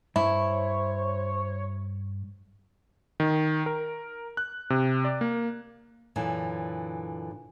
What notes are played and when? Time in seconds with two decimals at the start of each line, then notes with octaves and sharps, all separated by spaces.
0.16 G2 E4 C5 C#5
3.20 D#3
3.66 A#4
4.37 F#6
4.70 C3
5.05 D5
5.21 A#3
6.16 F#2 A#2 D3 E3